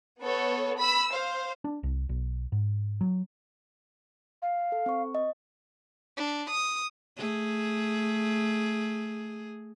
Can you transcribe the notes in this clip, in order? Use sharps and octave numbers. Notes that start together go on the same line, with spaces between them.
B3 A4 C#5
B5 E6
C5 F5
D4
C2
B1
G#2
F#3
F5
A4
C4 C#6
D#5
D4
D#6
A3 G#4